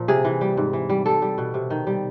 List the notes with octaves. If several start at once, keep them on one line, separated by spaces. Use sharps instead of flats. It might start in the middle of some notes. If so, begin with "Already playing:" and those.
Already playing: A#2 F3
C3 G#4
E3
G3
G#2
E3
G3
G3 A4
G3
B2
C3
D#3
G3